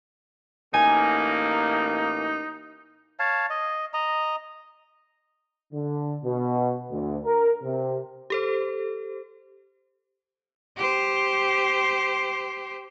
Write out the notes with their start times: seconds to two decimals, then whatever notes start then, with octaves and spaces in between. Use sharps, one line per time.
0.74 A1 A#3 D#4 G#5
3.19 C#5 F5 A5
3.50 D#5
3.93 D#5 A#5
5.72 D3
6.24 B2
6.91 D2
7.24 A#4
7.63 C3
8.30 G4 A4 C5
10.77 G4 C5